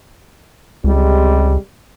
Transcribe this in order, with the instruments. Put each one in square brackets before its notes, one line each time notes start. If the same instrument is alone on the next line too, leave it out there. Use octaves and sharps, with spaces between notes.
[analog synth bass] C#2 [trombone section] C3 G3 G#3